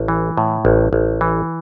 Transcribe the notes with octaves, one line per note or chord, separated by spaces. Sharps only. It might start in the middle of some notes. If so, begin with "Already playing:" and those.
Already playing: A1
E3
A2
A1
A1
E3